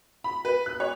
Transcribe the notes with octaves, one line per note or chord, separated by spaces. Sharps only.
B5
B4
F#6
C#5